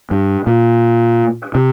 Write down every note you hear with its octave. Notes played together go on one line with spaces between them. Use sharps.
G2
A#2
C3